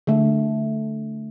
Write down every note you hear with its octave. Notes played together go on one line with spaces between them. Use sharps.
D3 A3